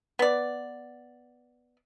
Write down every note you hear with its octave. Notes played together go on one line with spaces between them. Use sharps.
B3 D5